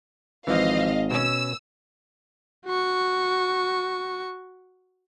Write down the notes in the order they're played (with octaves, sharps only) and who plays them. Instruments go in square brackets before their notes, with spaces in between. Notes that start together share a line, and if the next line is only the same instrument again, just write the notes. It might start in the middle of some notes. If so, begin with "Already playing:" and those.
[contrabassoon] G#1 [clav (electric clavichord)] E3 F3 [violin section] D#5 F5
[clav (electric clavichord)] B2 C#4 [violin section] E6
[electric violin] F#4 C#6